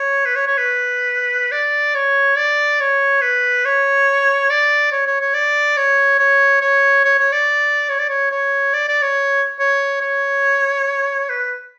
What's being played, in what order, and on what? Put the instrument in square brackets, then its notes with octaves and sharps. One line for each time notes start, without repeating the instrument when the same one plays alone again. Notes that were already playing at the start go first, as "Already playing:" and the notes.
Already playing: [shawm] C#5
B4
C#5
C#5
B4
D5
C#5
D5
C#5
B4
C#5
D5
C#5
C#5
C#5
D5
C#5
C#5
C#5
C#5
C#5
D5
C#5
D5
C#5
C#5
D5
D5
C#5
C#5
C#5
B4